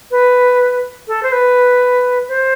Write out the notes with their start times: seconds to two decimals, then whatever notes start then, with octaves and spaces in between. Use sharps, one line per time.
0.11 B4
1.08 A4
1.23 C5
1.32 B4
2.29 C5